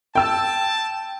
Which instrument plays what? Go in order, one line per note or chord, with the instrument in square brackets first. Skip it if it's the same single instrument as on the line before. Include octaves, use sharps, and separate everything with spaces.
[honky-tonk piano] G5 E6 [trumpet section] A5